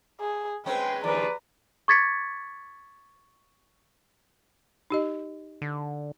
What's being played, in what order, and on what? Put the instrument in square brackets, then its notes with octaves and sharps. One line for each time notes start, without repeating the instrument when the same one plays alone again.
[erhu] G#4
[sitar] G#3 C4 C#4 [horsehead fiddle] B4 [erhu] G5
[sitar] D#2 F3 [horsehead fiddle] B4 D5 [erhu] A#5
[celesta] C#6 D6 G#6 A6 B6 C#7
[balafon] D#4 G4 D#5
[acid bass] D3